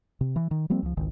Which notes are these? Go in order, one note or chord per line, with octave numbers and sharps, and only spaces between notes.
C3
E3
D#3
F3 G3 A#3 C4
C#2 F3
G#1 C#2 D#3